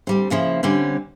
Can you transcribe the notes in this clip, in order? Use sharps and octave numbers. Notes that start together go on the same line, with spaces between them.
D2 G3 C4
A#2 C#3 F3 E4
D3 G3 C4 C#4